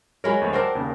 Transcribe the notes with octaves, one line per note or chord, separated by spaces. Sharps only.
F#3 G#3 A#4 C#5 B5
D2 A3 C#5
C4 D4 A#4 C5 F#5
D#2 C#3